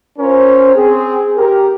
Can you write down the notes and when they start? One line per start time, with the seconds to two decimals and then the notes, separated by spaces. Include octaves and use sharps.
0.18 C#4 F4 A#4 C5
0.75 C4 G#4
1.36 G4 A#4